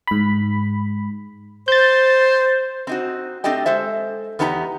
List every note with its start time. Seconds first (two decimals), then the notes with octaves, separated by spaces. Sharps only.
0.07 G#2 B5
1.68 C5 G6 A6
2.87 C4 D#4 F#4
3.44 A3 C4 D4 G4 D#5 G5
3.66 G#3 A4 C5 E5
4.39 E2 B3 D#4 G4 A#5